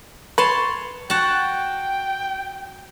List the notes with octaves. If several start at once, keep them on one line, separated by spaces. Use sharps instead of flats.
B4 C#5 A5 C6
F#4 F#5 G5 A5